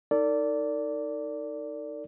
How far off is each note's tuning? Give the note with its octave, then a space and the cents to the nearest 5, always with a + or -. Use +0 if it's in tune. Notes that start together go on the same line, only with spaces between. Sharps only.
D#4 +0 A4 +45 D5 -15